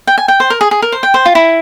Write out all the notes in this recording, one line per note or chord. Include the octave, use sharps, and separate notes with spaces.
G5
G#5
G5
C5
A#4
G#4
G#4
A#4
C5
G5
C5
F4
E4